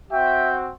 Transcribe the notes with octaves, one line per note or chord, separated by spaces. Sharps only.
C4 F#4 E5 G5